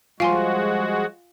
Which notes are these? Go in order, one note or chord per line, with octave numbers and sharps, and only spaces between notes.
F3 G3 G#3 F4 F#4 F5 G#5 C6